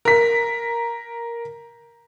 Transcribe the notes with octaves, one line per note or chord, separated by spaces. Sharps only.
A#4 B6